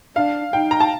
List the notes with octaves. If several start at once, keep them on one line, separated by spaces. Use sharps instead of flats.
D4 F5
D#4 G5
A#5
A5